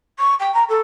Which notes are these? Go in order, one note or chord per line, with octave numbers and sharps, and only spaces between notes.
C#6
G5
A#5
A4